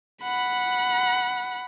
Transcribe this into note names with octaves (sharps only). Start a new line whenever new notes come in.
F#5 B5